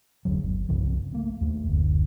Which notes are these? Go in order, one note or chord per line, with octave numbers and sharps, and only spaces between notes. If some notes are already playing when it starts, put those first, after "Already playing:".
F1 D#2 D3 F#3
G1
C2 G2 C#3 F3
A3 A#3 C4
D#2 A3
F#1 D2